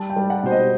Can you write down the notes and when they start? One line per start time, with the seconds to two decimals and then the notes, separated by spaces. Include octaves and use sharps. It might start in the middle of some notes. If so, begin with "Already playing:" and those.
Already playing: G3 A5
0.10 G5
0.16 G3
0.30 F#5
0.43 B2 C5
0.51 D#5